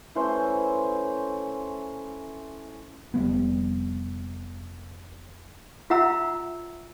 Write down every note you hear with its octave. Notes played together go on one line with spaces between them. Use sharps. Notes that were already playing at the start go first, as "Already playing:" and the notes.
E3 A3 C#4 C5
F1 G3 B3
F4 E5 F#5 A#5 E6